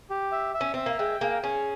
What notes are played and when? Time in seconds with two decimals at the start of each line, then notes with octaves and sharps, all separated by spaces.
0.10 G4
0.32 E5
0.54 E5
0.61 C#4
0.74 C4 E5
0.86 A#3
0.99 G#3 G5
1.21 A#3 G#4
1.44 C#4 G#4